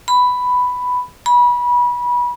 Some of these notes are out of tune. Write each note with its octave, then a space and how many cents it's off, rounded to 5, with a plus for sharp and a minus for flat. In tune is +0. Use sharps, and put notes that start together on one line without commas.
B5 +5
B5 -25